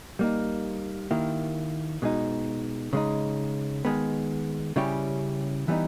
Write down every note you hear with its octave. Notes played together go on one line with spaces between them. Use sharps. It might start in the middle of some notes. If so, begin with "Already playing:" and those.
G3 A#3 D#4
D#3 A#3 E4 G4
B2 G#3 D#4
C#3 G#3 D#4
D#3 G#3 B3
C#3 G3 C#4 E4 G4
E3 G3 B3 D#4